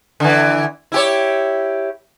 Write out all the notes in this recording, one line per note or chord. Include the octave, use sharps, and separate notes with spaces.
D3 E3
E4 G4 C#5